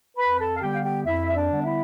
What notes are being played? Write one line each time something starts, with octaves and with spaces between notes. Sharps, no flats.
F2 B4 B5
A4 A5
F5
D3 G3 B3 G4 G5
F5
G4 G5
F2 E4 E5
E5
D4 D5
D3 G3 B3
E4 E5